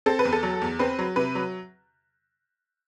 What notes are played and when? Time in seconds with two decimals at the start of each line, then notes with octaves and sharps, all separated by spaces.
0.06 C4 A4
0.19 B4
0.25 E2
0.33 A4
0.43 F#3
0.62 E2
0.79 C4 B4
0.99 F#3
1.16 C3 B4
1.35 F#3